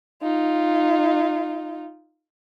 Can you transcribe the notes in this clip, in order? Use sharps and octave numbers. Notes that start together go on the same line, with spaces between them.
D#4 F4